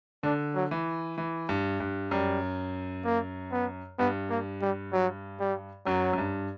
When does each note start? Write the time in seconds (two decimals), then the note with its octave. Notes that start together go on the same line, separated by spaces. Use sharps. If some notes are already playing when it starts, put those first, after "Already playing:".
0.23 D3 D4
0.55 F#3
0.71 E3
1.18 E3
1.49 G2
1.80 G2
2.11 F#2 G3
3.05 A#3
3.52 B3
3.99 G2 B3
4.30 A#3
4.62 G3
4.93 F#3
5.40 G3
5.86 F#2 F#3
6.13 F#2
6.18 G2